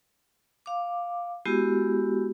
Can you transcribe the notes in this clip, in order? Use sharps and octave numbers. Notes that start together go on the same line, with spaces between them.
F5 D6
G#3 B3 E4 F#4 G4